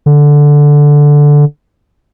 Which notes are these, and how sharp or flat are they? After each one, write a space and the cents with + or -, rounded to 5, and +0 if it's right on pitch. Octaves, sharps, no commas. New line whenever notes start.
D3 -5